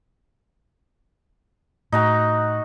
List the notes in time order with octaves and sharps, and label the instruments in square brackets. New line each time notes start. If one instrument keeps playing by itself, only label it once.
[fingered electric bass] A2 [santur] D#4 F#4 A#5